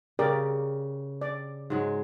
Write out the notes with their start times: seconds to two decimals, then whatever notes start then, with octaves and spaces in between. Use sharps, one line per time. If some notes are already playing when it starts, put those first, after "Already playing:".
0.19 C#3 G4 A#4 D5
1.21 D5
1.70 G#2 F#3 G#3